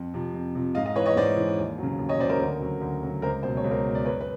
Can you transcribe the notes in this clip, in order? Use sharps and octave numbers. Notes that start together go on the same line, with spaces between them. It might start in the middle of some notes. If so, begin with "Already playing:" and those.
Already playing: F2
C3 F3
F2
C3 F3
G#2 D#5 F5
D#5 F5
E3 B4 C#5
C#5 D#5
G#2 C5 D5
E3
D#2
C#3 F#3
D#2
C#5 D#5
C#3 F#3 C5 D5
A#4 C5
D2 A#4
C#3 F#3
D2
C#3 F#3
C#2 A#4 C5
B2 F#3 C5
C#5
C#2
A#4 C5
B2 F#3
D5
F#2 B4 C#5
B4